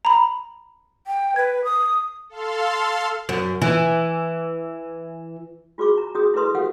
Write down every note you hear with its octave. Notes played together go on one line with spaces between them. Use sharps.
A#5 B5
G5
B4 G#6
D#6
A4 F5 C6
F#2
E3
F4 F#4 G#4 C#6 D6
A#5
C#4 F#4 G#4 D#6
E4 G#4 A4 B4 C6 D#6
F#4 G4 A4 F5 F#5